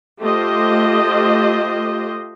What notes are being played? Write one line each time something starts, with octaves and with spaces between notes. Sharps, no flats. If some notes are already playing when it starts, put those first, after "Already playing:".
A3 F4 G4 C5 D#5